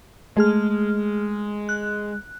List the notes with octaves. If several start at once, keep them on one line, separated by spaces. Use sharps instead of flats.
G#3 A3 G#4 F6
F#6